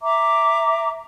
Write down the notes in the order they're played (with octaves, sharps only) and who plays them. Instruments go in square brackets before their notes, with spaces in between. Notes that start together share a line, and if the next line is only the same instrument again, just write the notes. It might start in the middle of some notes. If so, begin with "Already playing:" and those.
[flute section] E5 A#5 D6